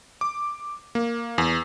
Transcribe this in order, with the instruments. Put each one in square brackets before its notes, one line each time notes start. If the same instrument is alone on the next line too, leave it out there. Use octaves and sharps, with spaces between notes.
[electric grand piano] D6
A#3
E2